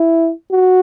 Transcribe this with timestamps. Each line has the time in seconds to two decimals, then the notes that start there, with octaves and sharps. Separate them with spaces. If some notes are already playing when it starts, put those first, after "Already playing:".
Already playing: E4
0.52 F#4